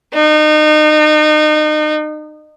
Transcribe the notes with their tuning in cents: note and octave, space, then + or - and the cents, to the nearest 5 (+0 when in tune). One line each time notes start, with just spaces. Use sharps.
D#4 -30